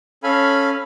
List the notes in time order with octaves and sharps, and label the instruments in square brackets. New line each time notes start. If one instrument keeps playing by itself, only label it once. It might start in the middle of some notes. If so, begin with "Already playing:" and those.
[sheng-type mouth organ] C#4 A4 F5 G#5 B5